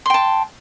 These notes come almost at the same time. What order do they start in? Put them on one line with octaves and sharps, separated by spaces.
C6 G5 A5